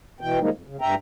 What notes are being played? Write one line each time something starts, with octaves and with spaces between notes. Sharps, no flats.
B2 E3 G5
D#3 F3 G3 G#3 A#3 D#4
F2
C#3
G2 E5 G5 A#5